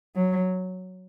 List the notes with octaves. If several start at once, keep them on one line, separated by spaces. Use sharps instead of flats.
F#3